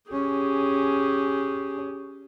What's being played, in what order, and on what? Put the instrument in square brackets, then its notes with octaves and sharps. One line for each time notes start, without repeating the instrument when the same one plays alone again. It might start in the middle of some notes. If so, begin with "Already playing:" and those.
[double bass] C#4 [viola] G4 G#4